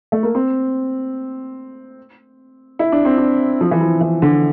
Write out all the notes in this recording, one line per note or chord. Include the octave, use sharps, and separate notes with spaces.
A3
A#3
C4
E4
D4
C4
D4
F3
E3
F3
E3
D3